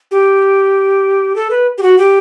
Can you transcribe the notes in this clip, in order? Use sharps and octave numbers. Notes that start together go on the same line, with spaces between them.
G4
A4
B4
G4
F#4
G4